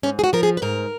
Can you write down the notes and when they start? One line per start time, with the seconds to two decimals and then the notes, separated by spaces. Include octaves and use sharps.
0.03 G#2 C#4
0.19 G#4
0.24 F#4
0.33 F3 A#4
0.43 G#4
0.57 B4
0.62 G#2 A#4